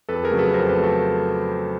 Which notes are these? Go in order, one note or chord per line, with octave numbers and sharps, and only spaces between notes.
F2 A4 B4
G#4 A#4
C#3 F#3 A3
A4 B4
F2 A#4 C5
A4 B4
C#3 F#3 A3
A4 B4